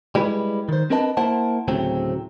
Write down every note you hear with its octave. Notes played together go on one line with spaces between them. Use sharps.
G3 G#3 E4 B4
D#3 C5
C4 D4 A#4 B4 D#5 A5
A#3 E4 C5 F#5 A5
D2 A2 C#3 F#3 C4